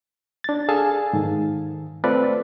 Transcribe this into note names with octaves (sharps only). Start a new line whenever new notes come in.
D4 A6
G#4 A4 F5 G#5 A5
G#2 D#3
A3 C4 F4 A4 B4 D5